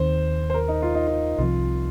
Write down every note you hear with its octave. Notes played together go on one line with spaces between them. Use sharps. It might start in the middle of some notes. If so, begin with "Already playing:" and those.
Already playing: D#2 D#3 C4 C5
C5
A#4
D#4
F4
D#4
F4
C2 C3 F3 F4